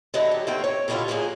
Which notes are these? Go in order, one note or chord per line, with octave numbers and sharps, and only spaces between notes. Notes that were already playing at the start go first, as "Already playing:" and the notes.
D3 F#3 E4 D#5
G4
D3 D#3 A3 A#3 C4 G5
C#5
B2 D3 D#3 G3 E4 F4
A#2 F3 F#3 A#3 G#4